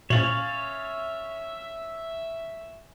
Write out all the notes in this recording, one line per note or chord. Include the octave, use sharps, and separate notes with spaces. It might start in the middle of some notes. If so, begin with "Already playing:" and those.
A#2 C#4 C#5 E5 F5 A6 F#7